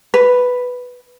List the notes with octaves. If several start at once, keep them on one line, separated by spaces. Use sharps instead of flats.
B4